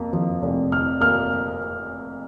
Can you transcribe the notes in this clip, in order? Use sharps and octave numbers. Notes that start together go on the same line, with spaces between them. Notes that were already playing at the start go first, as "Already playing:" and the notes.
Already playing: F2 A#3
F3
F1
F2 F6
A#3 F6